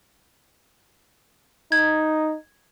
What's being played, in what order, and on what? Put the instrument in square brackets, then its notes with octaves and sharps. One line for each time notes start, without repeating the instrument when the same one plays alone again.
[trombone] D#4 [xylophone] G#6